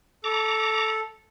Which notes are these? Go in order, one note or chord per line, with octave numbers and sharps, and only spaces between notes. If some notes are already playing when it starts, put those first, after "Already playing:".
A4 A#5 D6